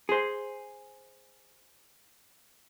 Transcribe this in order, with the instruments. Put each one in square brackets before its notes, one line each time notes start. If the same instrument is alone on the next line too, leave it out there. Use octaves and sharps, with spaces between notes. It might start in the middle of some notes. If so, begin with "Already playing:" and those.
[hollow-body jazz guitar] G#4 C5